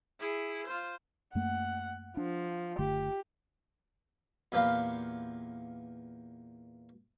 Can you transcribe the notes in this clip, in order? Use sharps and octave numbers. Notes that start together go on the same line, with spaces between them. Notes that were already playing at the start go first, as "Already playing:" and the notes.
E4 G#4
F4 C5
F#2 A3 A#3 F#5
F3 D4
F#1 D3 A3 G4
E2 A#2 G4 B4 F5